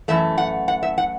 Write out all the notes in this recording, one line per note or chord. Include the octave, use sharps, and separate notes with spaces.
F#2 E3 A3 E5
F#5
F#5
E5
F#5